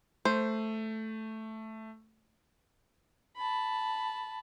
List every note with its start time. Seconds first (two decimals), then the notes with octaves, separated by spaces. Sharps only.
0.25 A3 C5
3.37 A5 B5